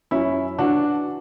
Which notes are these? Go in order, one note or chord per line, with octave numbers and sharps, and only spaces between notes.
F#2 C#4 E4
E3 D4 F#4